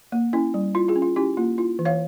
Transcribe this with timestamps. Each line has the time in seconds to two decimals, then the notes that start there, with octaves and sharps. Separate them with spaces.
0.12 A#3
0.33 C#4 E4
0.54 G3
0.75 E4 F4
0.88 F4 G#4
0.96 C#4
1.02 F4
1.16 C#4 E4 G4
1.37 A#3 F4
1.58 E4 F4
1.79 E3
1.85 C#5 F5